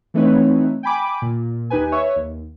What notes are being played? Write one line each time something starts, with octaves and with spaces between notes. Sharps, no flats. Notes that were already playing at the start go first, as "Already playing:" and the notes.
E3 A3 C4 D#4 B4 C#5
G5 G#5 B5 D6
A#2
D#2 D#4 G4 B4 G#5
B4 C#5 E5 C#6
D#2